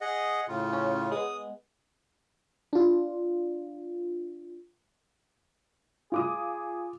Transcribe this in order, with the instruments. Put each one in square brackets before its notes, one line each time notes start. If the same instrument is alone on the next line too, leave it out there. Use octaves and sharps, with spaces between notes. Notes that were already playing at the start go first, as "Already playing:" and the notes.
[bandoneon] G#4 D#5 F#5
A2 C#3 F4
[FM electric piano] C#4
[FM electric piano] G#3 B3 [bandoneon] D#6
[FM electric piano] D4 F4
[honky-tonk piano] F4 D6 D#6 [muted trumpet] G#4